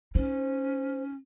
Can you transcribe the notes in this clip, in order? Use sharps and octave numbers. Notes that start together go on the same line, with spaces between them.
C#4 D#4 C5